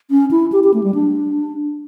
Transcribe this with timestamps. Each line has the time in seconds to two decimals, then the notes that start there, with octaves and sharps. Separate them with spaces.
0.10 C#4
0.31 E4
0.52 G4
0.64 G4
0.74 A3
0.84 G3
0.95 D4